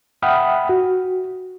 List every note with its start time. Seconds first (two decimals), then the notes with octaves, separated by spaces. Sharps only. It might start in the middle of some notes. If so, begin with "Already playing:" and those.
0.22 E5 F#5 G5 B5 D#6 F6
0.69 F#4